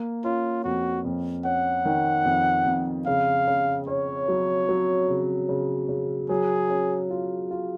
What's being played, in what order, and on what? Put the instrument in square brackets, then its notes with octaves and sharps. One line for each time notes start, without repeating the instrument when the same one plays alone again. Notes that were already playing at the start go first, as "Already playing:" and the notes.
Already playing: [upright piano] A#3
[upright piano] C#4 [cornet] F4
[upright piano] F2 [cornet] F#4
[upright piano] F2
[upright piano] C#4 [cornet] F#5
[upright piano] D#3
F2
F2
[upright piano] C#3 [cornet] F5
[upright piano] C#3
[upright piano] C#4 [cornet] C#5
[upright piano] F#3
F#3
C#3
C#3
C#3
[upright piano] F#3 [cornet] G#4
[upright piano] C#4
F4
F4